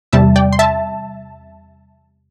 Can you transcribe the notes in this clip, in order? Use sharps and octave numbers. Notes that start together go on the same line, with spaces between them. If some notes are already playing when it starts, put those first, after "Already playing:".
E2 C3 G3 E5 A5
D5 G5
C6
E5 A5